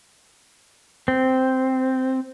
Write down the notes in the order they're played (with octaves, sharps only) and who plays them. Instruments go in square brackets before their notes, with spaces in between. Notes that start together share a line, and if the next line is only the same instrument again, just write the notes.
[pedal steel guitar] C4